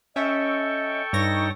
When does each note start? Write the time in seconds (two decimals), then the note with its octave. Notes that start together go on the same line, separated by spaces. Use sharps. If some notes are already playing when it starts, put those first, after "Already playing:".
0.16 C#4 A4 D#5 E5 G5 C#6
1.13 G2 D#4 C#5 A#6